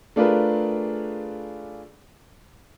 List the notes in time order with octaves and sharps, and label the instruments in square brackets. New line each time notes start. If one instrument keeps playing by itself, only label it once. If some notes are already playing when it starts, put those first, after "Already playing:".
[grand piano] A3 D4 F4 G#4 A#4 B4